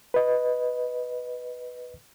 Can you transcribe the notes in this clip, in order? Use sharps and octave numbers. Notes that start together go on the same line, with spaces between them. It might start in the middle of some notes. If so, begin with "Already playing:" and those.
B4 D#5